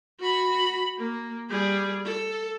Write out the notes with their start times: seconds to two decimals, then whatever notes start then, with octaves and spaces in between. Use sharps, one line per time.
0.20 F#4 B5
0.98 A#3
1.49 G3 G#4
2.04 A4